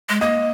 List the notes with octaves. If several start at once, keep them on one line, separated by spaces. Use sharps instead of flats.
G#3
A#3 D#5